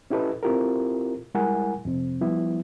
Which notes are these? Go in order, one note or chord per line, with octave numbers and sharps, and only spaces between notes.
C#4 E4 G4 A4 B4 D#5
C4 E4 F4 G4 A4 A#4
G3 G#3 E4 A#4 F#5 G#5
F2 C3 C4
F3 G3 B3 E4